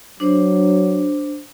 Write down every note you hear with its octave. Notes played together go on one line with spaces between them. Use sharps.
F#3 D4 C5